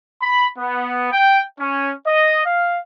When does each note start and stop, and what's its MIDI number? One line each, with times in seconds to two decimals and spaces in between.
0.22 0.47 83
0.58 1.09 59
1.12 1.41 79
1.59 1.92 61
2.07 2.44 75
2.46 2.78 77